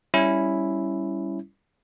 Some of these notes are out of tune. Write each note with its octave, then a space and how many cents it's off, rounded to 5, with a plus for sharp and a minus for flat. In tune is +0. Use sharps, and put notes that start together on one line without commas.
G3 +0 C#4 +0 E4 +0